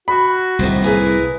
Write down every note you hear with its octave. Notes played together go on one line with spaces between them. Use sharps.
F#4 B5
C2 A2 D#3 C5 E5
E4 G#4 A#4 B4